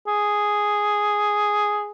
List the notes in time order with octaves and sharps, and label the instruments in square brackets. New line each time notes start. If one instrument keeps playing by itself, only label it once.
[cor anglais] G#4